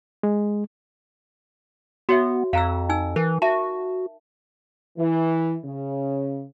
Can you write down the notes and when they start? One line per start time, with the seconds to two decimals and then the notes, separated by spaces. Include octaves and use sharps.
0.23 G#3
2.09 B3 F#4 C#5 E5
2.53 F2 F5 A#5 E6
2.89 D#4 G#5 E6
3.16 E3 A#4
3.42 F#4 E5 A5
4.98 E3
5.65 C#3